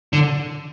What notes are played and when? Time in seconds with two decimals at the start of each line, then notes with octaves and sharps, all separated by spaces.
0.13 D3